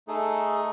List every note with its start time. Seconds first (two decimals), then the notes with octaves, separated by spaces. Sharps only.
0.08 A3 D#4 G#4 A4